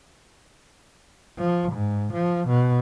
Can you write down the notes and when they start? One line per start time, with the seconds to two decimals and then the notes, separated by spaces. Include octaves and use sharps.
1.38 F3
1.73 G#2
2.13 F3
2.48 B2